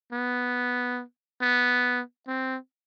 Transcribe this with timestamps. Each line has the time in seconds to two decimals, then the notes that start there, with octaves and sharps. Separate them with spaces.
0.13 B3
1.42 B3
2.27 C4